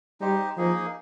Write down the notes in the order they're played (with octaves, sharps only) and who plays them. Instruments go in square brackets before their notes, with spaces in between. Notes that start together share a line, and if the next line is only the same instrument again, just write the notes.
[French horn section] G3 [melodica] D#4 G4 C5
[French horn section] F3 [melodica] A#3 D#4 G#4